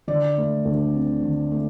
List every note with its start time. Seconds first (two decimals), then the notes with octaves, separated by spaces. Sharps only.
0.07 D3 D5
0.37 A3
0.65 D2
0.94 C4
1.23 D3
1.52 A3